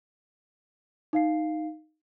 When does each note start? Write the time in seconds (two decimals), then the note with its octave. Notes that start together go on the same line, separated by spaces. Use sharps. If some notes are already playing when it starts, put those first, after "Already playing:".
1.13 D#4 F5 C7